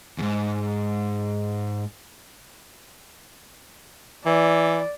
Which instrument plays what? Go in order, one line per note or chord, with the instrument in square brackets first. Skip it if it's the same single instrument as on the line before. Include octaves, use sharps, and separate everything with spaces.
[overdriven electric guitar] E2 G#2
[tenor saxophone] E3 [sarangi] D5